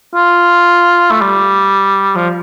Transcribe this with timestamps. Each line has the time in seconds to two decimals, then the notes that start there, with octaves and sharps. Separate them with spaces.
0.15 F4
1.11 A3
1.22 G3
2.15 F3